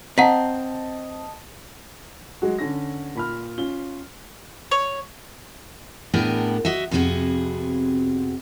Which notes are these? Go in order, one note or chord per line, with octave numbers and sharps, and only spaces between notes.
C4 D#5 F#5 A5 A#5 B6
F#3 G#3 F#4
D3 C#4 A#6
A#2 B5 F6
C#4 F4 G7
C#5
A2 B3 D4 G#4 A#4 G5
F#4 D#5 E5
F2 C3 B3 E4 F#4 G#4